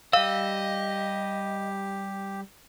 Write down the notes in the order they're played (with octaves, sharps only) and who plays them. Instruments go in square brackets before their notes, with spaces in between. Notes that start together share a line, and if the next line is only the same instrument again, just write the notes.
[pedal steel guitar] G3 E6 [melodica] G4 [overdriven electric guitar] D#5 [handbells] F5